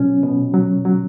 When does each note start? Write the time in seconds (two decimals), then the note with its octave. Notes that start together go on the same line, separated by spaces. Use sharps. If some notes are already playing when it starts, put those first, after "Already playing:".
Already playing: B2 F#3 C#4
0.23 B2
0.54 F#3
0.85 F#3